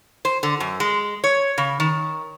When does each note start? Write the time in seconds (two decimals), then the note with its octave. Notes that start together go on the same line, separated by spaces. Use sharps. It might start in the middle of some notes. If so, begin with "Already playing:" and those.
0.25 C5
0.43 D3
0.60 F#2
0.80 G#3
1.24 C#5
1.58 C#3
1.80 D#3